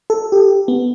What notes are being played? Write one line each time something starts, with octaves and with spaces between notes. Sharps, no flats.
A4
G4
B3